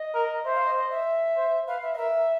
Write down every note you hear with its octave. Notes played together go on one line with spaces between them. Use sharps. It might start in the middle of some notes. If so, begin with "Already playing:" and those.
Already playing: D#5
A#4
C5 E5
F5
D#5
D#5
E5
C5
B4 F5
E5
D#5
A#4 E5